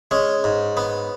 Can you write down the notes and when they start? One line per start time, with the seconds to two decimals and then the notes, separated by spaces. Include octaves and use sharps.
0.11 G#3 C#4
0.44 G#2
0.77 B3